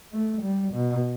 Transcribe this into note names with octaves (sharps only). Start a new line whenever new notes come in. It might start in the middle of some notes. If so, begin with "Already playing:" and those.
A3
G3
B2